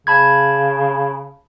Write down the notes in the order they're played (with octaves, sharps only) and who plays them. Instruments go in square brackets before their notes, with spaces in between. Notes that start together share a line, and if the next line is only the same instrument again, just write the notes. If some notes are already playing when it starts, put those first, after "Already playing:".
[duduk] C#3 [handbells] A5 B5 G#6